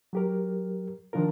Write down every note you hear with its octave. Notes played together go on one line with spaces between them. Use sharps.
F#3 G4 A#4
D#3 F3 D4 F4 A#4